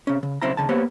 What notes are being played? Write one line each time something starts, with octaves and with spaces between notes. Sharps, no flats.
C3 C#4
C#3
B1 C#3 C4 E4 A#5
D#2 C#3 A5
A#3 B3 G4 C5 C#5